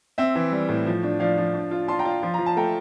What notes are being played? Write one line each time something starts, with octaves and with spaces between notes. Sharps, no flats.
C4 E5
E3
G3
A2
F3
D4
F3 D5 F5
F3
D4
F4
F4 A5 C6
G5 A#5
F4
F3 C6
F3 A#5
A5
A3 G5 A#5